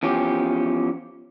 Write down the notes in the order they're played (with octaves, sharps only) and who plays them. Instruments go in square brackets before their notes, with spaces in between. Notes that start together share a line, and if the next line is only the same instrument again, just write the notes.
[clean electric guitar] E2 F3 C#4 G4